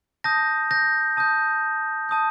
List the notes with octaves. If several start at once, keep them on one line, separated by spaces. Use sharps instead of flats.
A5 D#6 G6 A#6
G6 A#6
A5 D#6 G6
A5 D#6 G6